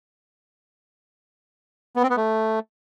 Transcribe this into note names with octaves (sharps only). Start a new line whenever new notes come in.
B3
C4
B3
A3